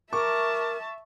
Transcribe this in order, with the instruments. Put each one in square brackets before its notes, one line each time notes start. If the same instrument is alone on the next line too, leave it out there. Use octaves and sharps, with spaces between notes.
[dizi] A#4 [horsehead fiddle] E5 A5 [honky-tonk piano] C#6 [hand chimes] D6